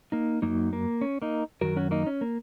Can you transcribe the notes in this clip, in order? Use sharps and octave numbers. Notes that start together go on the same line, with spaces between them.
A#3 D#4
F#2 F#3 A#3 D#4
A#3
C#4
A#3 D#4
F#2 D#3 F#3 F#4 A#4
C#4 F#4
A#3 D#4
C#4
A#3